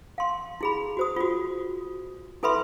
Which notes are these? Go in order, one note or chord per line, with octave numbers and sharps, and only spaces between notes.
F5 C6
E4 G#4 B5
F#4 C5 D#6
F4 F#4
E4 A4 B4 E5 B5 C6